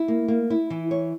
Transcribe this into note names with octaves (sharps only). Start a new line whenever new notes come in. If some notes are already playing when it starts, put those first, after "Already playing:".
Already playing: E4
A#3
A#3
E4
E3
C#5